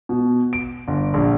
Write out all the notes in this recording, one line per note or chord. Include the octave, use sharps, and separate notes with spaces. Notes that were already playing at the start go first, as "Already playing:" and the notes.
B2
D7
G1
A#1